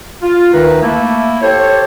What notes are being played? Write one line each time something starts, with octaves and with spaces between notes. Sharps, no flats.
F4
D2 D#3 A3 D#4 B4
A3 A#3 E4
G4 A4 C5 C#5